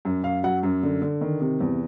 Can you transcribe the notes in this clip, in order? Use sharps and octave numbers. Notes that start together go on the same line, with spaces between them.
F#2
F#2 F5
F#3 F#5
F#2
D3
D3
D#3
C3
E2